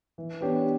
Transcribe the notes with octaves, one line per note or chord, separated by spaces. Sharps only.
E3
B3 D4 G4 C#5